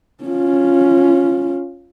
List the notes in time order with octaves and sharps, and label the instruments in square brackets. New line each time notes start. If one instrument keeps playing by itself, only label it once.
[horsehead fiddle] C#4 F4